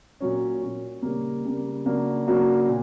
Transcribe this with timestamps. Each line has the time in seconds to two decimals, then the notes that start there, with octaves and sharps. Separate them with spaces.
0.20 A#2 F#3 C#4
0.62 A#2 F#3 C#4
1.02 C#3 G3 A#3
1.44 C#3 G3 A#3
1.85 C#3 F#3 A#3 D4 F#4
2.27 C#3 F#3 A#3 D4 F#4
2.68 A#2